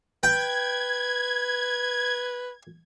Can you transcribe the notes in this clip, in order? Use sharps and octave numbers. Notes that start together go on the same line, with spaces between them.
B4 G5 G#6